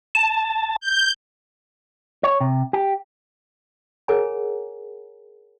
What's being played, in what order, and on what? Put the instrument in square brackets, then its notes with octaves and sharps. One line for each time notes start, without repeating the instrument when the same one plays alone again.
[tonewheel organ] A5
[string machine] G6
[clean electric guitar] C#5
C3
G4
[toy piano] G#4 A#4 C#5 F#5 G#5 A#5